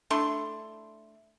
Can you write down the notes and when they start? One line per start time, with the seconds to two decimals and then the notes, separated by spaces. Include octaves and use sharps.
0.10 A3 D4 E4 C6